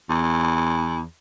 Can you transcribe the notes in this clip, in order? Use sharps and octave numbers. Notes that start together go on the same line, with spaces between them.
E2